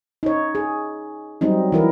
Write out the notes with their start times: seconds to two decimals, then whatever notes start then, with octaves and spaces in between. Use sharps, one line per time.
0.23 D#4 C#5
0.55 G#4
1.41 F#3 G3 C4 D#4
1.72 E3 E4 A#4